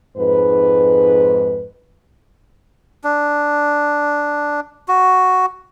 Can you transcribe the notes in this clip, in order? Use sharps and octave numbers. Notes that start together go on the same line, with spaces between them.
F2 G#2 B4
D4
F#4